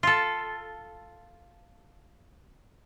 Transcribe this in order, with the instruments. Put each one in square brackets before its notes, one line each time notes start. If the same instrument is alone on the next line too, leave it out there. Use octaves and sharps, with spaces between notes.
[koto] F4 A4